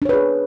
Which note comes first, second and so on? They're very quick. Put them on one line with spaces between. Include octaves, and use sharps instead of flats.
D4 C#5 B4 G#4